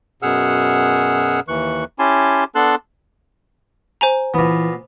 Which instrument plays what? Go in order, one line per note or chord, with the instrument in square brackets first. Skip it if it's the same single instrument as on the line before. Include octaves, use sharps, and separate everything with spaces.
[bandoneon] F#2 B2 G#4 F#5 E6 F6
D#2 E3 C#6 F#6
C#4 E4 G4 G#5 A5 C6
B3 D4 A4 A5 C6 F#6
[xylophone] C5 G#5 A#5
[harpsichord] A#2 B3 [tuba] E3